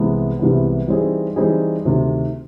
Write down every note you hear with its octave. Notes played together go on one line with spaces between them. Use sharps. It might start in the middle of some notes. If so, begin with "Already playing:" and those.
Already playing: C2 C3 E3 G#3 B3
C2 C3 E3 G#3 B3
E3 G3 C4 D#4 G#4
E3 G3 C4 D#4 G#4
D2 C3 D#3